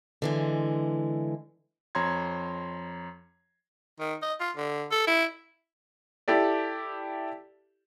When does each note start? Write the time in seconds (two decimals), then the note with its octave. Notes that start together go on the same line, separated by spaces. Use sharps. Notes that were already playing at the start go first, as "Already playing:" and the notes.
0.22 D3 E3 G#3
1.95 F2 C#5 A#5 C6 G#6
4.00 D#3
4.22 D#5
4.40 F4
4.56 D3
4.91 A4
5.07 E4
6.28 E4 G4 A4 D5